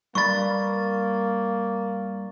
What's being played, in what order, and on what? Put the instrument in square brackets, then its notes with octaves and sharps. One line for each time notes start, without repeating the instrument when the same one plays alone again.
[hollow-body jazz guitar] G2 B5 [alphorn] A#3 [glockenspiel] C#6 A6